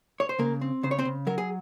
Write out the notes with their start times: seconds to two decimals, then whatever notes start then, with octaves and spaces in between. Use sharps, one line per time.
0.20 C#5
0.29 C5
0.39 C#3 A#3 A#4
0.61 C4
0.83 C#3 C5
0.91 C#5
0.99 C4 C5
1.05 C#3
1.27 F#3 A#4
1.38 G#4